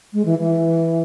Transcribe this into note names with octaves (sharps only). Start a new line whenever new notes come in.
G#3
E3
E3